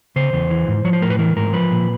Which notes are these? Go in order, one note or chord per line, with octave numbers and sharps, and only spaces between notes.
C#3 C5
E2
E3
G#2
F3 C#5
C5
A2 A#4
B4
E3 A#4
G#2 A#4
F3 B4
A#2